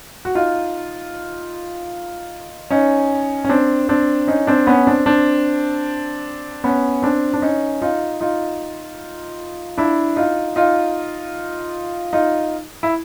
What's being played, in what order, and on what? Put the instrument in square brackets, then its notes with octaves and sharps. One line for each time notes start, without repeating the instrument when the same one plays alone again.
[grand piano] F#4
D#4 F4
C#4 D#4
C#4
C4 D4
C4 D4
C#4 D#4
C4 D4
B3 C#4
C4 D4
C4 D4
B3 C#4
C4 D4
D4
C#4 D#4
D#4 F4
D#4 F4
D4 E4
D#4 F4
D#4 F4
D#4 F4
E4